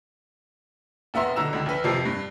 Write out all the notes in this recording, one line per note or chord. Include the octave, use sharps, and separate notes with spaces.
E1 B3 E5 A#5 C6
B1 D3 A#5 E6 E7
C#2 D3
A#1 B4
F2 C3 F3 A#4 C7
G2